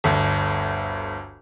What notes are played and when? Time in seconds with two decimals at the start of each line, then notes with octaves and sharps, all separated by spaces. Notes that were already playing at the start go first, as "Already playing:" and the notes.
0.04 G1 D2